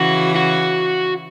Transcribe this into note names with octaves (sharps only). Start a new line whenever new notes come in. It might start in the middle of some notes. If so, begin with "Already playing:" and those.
Already playing: C#3 E3 F#4
F#4